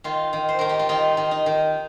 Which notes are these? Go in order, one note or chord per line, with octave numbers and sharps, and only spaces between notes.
D#3 F4
D#3
C5
D#3 A#4
G4
F4
D#3 D#4
D#3
D#4
D#3